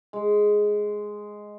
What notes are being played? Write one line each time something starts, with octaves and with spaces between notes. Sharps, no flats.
G#3